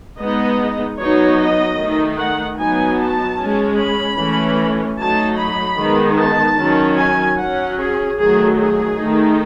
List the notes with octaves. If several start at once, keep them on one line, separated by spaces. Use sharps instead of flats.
G#3 B3 D#4 D#5
F#3 B3 D#4 C#5
D#5
D#3 A3 D#4
F#5
F#3 B3 D#4 G#5
A5
G#3 C#4
B5
E3 A3 C#4
F#3 A3 D#4 A5
B5
D#3 G#3 B3 D#4
A5
D#3 F#3 C#4
G#5
F#3 C#4 F#5
G#4
D#3 F#3 A3 G#4
G#4
D#3 A3 D#4